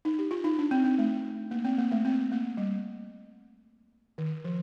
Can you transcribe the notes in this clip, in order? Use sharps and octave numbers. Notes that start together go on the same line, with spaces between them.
D#4
G4
F4
D#4
D4
C4
C4
A3
A#3
C4
A#3
A3
C4
A#3
G3
D#3
F3